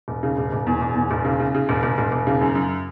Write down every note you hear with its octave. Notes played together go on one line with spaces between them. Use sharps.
E1
C#3
E1
E1
E2
E1
E2
E1
C#3
C#3
C#3
E1
E1
E1
E1
C#3
F#2
F#2